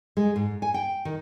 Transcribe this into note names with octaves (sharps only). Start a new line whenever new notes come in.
G#3
G#2
G#5
G5
D#3